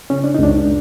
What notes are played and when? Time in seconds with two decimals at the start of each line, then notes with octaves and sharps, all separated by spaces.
0.10 C#3 C#4
0.24 D4
0.34 C#2 D#4
0.43 D4